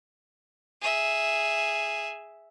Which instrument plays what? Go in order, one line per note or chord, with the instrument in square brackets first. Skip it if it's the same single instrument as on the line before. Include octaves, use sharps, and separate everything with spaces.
[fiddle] G#4 E5